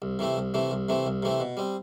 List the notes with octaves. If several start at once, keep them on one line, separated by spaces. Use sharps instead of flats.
C2
C3 E3 A3 C4
C2
C3 E3 A3 C4
C2
C3 E3 A3 C4
C2
C3 E3 A3 C4
B2
G3 C4